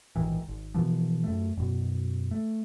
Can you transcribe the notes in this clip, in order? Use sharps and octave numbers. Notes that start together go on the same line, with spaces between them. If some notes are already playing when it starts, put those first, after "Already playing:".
A#1 G#2 D#3 E3
G#1
B2 E3 F3
F#2 A3
F#2 B2
A3